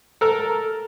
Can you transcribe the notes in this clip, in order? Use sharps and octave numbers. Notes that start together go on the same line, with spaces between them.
A4 A#4